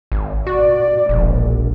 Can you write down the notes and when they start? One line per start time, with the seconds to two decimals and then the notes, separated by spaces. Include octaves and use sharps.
0.12 G#1
0.47 F#4 D5
1.09 E1 A#1